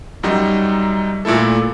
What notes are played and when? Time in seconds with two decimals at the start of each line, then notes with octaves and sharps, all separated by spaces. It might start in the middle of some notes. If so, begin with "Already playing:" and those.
0.23 F#2 F#3 G3 D#4
1.25 A#2 A3 E4 A4